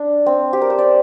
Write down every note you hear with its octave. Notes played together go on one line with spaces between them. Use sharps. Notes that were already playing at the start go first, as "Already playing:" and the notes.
Already playing: D4
C4
G4
A#4
C5
D5